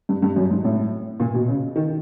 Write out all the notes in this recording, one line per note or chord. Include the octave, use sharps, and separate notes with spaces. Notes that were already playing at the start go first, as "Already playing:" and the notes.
G2
G2
F#2
G#2
A2
A#2
B2
C#3
D#3